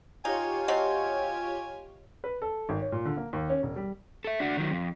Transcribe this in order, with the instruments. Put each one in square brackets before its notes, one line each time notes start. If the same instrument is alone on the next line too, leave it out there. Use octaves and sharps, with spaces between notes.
[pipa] D#4 [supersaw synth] F4 G4 C#5 [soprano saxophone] G#5
[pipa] F3 F#3 C4 [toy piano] D#5
[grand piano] B4
A4
G#1
C#5
A#2
D3
A#3
D#2
C#4
E1
G3
[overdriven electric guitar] A4 E5
D4 F#4
D#3 F#3
F2